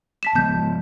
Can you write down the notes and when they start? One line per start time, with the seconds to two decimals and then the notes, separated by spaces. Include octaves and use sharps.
0.23 A5 B6 E7
0.35 F3 G#3 B3 A5 G6